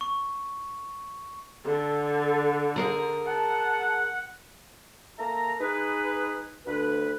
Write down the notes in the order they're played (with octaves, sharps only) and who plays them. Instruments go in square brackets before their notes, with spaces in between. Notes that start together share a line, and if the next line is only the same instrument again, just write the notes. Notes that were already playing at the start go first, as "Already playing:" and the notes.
[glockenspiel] C#6
[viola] D3 [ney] A4
[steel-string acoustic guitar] G#4 A#4 A#5
[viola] F#5 [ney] A5
[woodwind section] A#3 A4 E5 A#5
D#4 G#4 B4
D2 B4